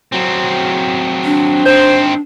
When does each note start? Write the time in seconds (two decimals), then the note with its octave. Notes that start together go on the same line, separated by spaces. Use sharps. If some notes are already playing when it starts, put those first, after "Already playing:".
0.12 F#3 C4
1.24 D4
1.65 D#3 C4 C5